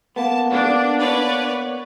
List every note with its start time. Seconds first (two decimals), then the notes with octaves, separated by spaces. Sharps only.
0.16 A#3 B3 A5
0.51 D4
0.99 B4 C#5 D5